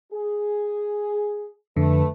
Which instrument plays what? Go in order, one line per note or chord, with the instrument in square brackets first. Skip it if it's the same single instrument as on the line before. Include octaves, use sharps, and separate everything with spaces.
[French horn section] G#4
[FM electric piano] F2 D3 [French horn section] A3 B4